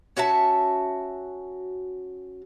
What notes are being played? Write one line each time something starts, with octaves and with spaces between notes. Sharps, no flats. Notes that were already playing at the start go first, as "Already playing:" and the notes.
C#4 F#4 E5 A5